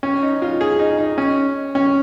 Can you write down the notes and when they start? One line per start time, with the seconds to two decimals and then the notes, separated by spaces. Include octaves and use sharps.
0.03 C#4
0.23 D#4
0.42 F4
0.61 G#4
0.79 D#4
0.98 D#4
1.18 C#4
1.75 C#4